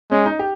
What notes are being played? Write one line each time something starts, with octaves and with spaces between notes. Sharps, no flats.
G#3 C#4
D#4
G4